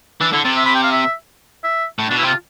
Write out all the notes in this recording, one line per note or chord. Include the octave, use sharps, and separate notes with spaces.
E3 D4
D3 E4
C3 A4
E5
B5
G5
F5
E5
E5
A2
B2 D4
E4
C3
F4